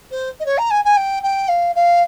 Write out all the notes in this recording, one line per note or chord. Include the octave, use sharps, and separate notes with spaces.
C5
D#5
C#5
A#5
G#5
G#5
G5
G5
F5
F5